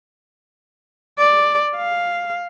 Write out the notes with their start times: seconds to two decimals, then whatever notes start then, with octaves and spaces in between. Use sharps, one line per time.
1.18 D5
1.76 F5